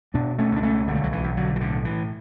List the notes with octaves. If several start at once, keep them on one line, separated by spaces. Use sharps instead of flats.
B2 B3 D4
A3 C#4
C#2 D4
A3 C#4
B1 D3
G3
F#3
E3
B1
D3 F#3
E3
A2 D3
E3